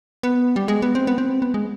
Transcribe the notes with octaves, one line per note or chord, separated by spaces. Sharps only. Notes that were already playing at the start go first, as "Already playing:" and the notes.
B3
G3
G#3
B3
C4
B3
C4
B3
G#3